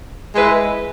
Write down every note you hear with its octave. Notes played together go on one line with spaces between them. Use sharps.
G#3 E4 B4